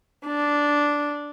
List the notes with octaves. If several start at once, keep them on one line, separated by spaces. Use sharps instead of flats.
D4